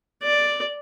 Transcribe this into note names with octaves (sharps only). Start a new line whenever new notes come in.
D5